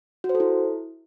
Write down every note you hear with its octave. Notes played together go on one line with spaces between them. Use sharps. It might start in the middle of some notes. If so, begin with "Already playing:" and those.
F#4
C5
A4
E4